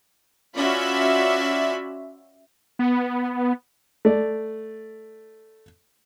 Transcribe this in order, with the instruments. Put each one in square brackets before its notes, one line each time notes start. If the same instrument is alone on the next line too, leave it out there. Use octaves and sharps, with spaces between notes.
[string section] C#4 F4 F#4 D5 E5 B5
[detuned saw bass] B3
[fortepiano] A3 D5